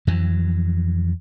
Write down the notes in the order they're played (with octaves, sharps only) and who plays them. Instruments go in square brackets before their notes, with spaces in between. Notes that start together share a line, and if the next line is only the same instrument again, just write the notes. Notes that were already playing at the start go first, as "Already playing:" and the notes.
[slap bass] F2 E3 F#3